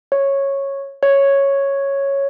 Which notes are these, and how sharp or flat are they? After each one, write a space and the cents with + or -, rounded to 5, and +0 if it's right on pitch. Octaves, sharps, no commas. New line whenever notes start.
C#5 -10
C#5 -5